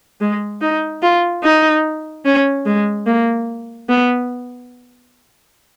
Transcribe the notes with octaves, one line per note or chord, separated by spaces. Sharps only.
G#3
D#4
F4
D#4
C#4
G#3
A#3
B3